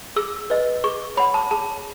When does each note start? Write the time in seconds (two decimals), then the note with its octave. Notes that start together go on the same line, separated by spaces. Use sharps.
0.16 G#4 E6
0.50 B4 D#5
0.84 G#4 C#6
1.17 C#5 F#5 B5
1.34 A5
1.51 G#4 A5